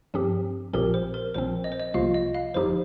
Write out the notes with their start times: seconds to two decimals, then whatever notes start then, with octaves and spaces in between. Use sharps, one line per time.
0.14 G2 F3 C4 G4
0.73 A#1 A#2 F3 C4 G4 A#4
0.94 C5
1.14 A#4
1.34 A#1 A#2 F3 C4 C5
1.64 D#5
1.72 C5
1.80 D#5
1.94 C2 C3 F3 A#3 F4 F5
2.14 D#5
2.35 F5
2.54 G1 F2 F3 D#4 G4 C5